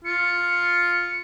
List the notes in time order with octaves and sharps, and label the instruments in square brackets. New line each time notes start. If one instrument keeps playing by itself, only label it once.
[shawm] F4 [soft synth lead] C#7